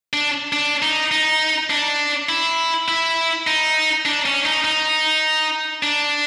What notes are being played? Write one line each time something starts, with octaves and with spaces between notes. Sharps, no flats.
D4
D4
D#4
D#4
D4
E4
E4
D#4
D4
C#4
D#4
D#4
D4